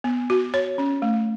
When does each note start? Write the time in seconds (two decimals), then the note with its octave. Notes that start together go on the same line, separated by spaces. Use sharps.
0.04 B3
0.30 F#4
0.54 C#5
0.78 C#4
1.02 A3